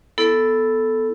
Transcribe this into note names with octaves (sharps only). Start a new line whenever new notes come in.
B3 E4 A4